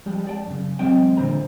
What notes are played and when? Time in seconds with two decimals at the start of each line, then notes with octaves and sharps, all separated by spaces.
0.06 F3 G3 G#3
0.27 D5 G5 A5
0.46 F#2 C#3
0.79 E2 F#3 G#3 C4 D#5 G5
1.17 A#2 D3 E3 C5 A#5 B5